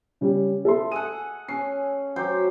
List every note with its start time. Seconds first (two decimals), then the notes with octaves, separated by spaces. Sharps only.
0.21 C#3 G3 C#4
0.65 A4 E5 C6
0.92 G#4 A4 F#5 D#7
1.48 C#4 C7
2.16 F#3 G4 C5